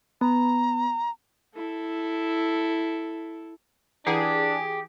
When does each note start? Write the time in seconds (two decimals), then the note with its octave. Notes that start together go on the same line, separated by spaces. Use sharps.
0.21 B3 A#5
1.55 E4 A4
4.07 E3 D4 E4 G4 G#4 F#5